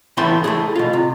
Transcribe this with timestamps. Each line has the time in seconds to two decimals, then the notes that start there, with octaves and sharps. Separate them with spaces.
0.17 A2 E3 B3 E4 G5 C6
0.44 A3 E4 G#4
0.76 B2 F4
0.93 C3